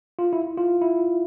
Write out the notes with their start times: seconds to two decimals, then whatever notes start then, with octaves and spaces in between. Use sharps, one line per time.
0.19 F4
0.33 E4
0.57 F4
0.81 E4